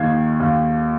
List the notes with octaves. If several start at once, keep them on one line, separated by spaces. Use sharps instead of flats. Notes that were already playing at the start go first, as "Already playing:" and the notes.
Already playing: D#2 D#3 G#6 C7
D#2